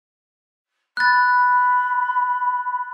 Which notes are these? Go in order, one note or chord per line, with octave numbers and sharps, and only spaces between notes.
B5 F#6 A6